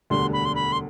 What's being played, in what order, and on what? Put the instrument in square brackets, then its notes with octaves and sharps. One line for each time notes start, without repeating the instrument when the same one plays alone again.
[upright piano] E1 D2 D3 G3 [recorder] C6
[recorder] B5
C6
B5
C6